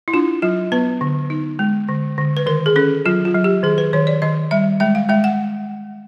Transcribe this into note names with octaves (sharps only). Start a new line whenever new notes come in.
E4
D4 F4
F#3 F4
B3 B4
D3
D#4
G#3
D3
D3
B4
D#3 A#4
G#4
C#4 A4
F#3 F4
F4
F#3
G4
D#3 G#4
B4
D#3 C#5
D5
D#3 D#5
G3 E5
G#3 E5
F5
G#3 E5
F#5